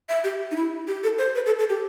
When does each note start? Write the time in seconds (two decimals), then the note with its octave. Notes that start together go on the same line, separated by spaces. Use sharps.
0.09 E5
0.24 G4
0.51 D#4
0.56 E4
0.87 G4
1.04 A4
1.18 C5
1.35 B4
1.46 A4
1.59 A4
1.70 G4